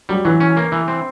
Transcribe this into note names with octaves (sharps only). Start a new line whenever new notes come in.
F#3 G3
E3 F#3
C#4
A#3
E3
C4